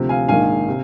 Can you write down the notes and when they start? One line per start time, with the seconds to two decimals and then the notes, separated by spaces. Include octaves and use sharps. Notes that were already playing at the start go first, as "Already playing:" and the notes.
Already playing: D2 C3 F3
0.09 F5 G#5
0.28 A#1 G#2 D#3 F5 G#5
0.68 C3